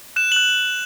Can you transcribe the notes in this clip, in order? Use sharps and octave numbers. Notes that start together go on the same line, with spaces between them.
F#6 E7
F#7
F#6